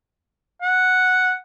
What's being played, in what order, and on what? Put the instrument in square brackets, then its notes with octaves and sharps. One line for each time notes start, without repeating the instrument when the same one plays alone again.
[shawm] F#5